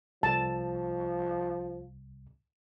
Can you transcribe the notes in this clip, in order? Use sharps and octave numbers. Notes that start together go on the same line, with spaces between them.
C2 F3 A5